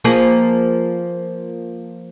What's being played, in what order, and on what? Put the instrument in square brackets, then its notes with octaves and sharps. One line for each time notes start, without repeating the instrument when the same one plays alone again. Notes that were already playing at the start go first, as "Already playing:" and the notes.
[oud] F3 A#3 G#4